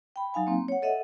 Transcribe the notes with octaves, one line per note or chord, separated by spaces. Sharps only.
G5 B5
F#3 D#4 F5 G#5
A#3 C4
C#5 F#5
A4 D#5 E5 F#5